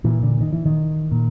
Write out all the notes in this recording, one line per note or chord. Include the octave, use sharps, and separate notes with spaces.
A#2 E3
D3
D#3
E3
D#3
A#2